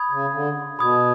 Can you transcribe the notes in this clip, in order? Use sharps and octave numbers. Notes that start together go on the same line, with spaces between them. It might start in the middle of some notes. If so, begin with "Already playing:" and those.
Already playing: B5 D#6 G#6
C#3
D3
B2 B5 D#6 G#6